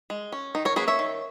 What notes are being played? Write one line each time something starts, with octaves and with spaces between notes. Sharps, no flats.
G#3
C#4
D#3 D#4
A#4 C#5
F#3 A#3 C#4 G#4 B4
C#5 E5
D#3